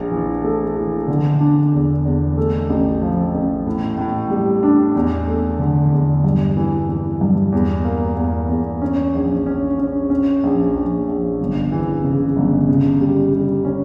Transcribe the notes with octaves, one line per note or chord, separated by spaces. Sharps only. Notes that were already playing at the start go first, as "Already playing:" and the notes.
Already playing: A#1
E3
A3
E3
D3
D4
E2
E2
A3
A1
F3
A1
A2
A2
G3
D4
E2
A3
D3
E2
G2
E3
E3
G2
E2
A#3
E2
E2
C#4
A#1
C#4
C#4
C#4
A#1
A#1
A#1
G1
E3
C#3
G1
C#3
G3
G3
C#4